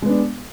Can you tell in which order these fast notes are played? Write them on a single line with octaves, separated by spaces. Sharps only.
G#3 B3 D4